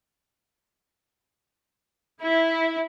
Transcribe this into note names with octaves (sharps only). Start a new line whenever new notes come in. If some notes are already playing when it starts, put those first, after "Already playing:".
E4